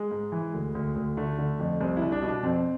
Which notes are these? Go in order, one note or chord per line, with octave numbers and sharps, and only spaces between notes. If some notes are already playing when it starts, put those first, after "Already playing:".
Already playing: G#3
G#2
E3
D2
D2
D2
D3 A3
D3
F2
C2 C4
C2 E4
D4
B2
D4
F2 C4